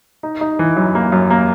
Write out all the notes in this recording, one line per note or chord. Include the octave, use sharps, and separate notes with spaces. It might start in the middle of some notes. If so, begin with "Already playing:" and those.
D#4
D#4
E3
F#2
A#3
F#2
A#3